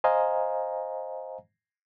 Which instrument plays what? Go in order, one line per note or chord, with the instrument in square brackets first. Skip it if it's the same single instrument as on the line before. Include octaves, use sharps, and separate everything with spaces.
[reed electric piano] C5 D#5 F5 G#5 A#5